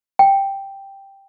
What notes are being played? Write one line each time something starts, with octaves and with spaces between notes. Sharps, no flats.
G5